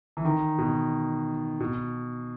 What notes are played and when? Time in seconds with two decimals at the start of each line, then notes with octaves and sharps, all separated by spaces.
0.17 E3
0.25 D#3
0.58 B2
1.60 B2